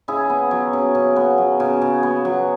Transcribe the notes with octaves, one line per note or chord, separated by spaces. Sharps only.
C#3 E4 G#4
B3
F#3
C#3
C#3
B3
F#3
C#3
C#3
B3
F#3